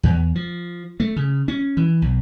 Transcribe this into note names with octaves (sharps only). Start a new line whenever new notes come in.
E2
F3
A3
C#3
C#4
E3
B1